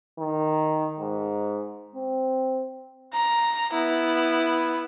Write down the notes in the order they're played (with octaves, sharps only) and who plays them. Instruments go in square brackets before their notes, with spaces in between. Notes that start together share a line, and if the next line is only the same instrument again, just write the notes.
[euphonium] D#3
G#2
C4
[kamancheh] A#5
B3 E4